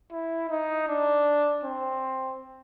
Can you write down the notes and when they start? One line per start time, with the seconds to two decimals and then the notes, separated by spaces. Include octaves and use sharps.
0.11 E4
0.50 D#4
0.88 D4
1.64 C4